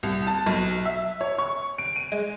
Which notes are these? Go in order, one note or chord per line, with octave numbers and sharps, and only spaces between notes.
C2
A5
B1
E5
C#5
C#6
D7
D#7
G#3